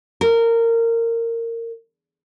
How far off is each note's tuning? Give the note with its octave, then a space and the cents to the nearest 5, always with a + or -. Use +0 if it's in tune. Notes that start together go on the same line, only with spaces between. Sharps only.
A#4 -20